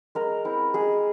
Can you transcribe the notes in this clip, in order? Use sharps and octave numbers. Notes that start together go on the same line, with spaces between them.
G#3 A#4
C4 E4
G#3 G#4